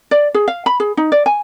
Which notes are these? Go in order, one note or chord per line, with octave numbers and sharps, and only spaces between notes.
D5
G#4
F5
B5
G#4
D#4
D5
G#5